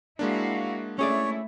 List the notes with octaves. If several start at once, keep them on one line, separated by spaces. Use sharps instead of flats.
G#3 A#3 D4 E4 F#4 F5
A3 C#4 E4 G#4 C#5 D5